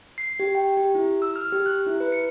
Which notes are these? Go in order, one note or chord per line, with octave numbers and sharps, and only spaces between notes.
C7
G4
G5
G4
E4
E6
F6
G4
F#6
E4
B4
C#7